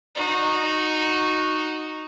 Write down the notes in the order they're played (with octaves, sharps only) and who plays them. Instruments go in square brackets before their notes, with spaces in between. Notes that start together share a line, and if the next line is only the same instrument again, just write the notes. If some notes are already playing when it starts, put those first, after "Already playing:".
[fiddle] D#4 F#4